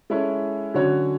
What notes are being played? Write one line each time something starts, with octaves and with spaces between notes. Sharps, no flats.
G#3 C#4 E4 A4 C#5
D3 F#3 C#4 F#4 C#5